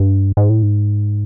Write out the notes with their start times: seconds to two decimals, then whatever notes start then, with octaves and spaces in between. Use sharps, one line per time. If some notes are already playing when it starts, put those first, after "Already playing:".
Already playing: G2
0.37 G#2
0.50 A2
0.63 G#2